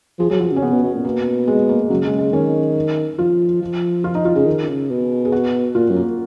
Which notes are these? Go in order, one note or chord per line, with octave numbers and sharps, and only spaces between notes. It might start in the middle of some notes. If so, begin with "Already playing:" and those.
F3 G#4
F#3 G#4
F3 F#4
C#3
C#4
C#3 B3
B2
B2
A#2
B2 A#3
G#3
A#3
C#3 F#3
G#3
G#3
D#3 C#4
F3 F4
F3
F4
D#4
F4
C#3 G#4
D#3
C#3
B2
G#4
F#4
A#2 F4
F#2
A#3